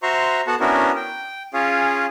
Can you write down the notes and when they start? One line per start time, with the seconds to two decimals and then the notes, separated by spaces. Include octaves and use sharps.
0.03 F#4 C5 E5 A#5 C6 C#6
0.47 B3 F#4 A4 F#5 A5
0.60 B3 C#4 D4 E4 F#4 A#4
0.96 G5
1.54 C#4 F4 G#4 C#5 F5